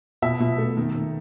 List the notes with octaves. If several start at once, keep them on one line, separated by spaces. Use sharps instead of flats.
B2 E5
B2
A3
D#3
D#3